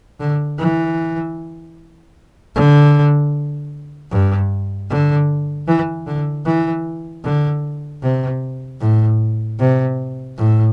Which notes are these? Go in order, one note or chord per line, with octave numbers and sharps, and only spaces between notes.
D3
E3
D3
G2
D3
E3
D3
E3
D3
C3
A2
C3
A2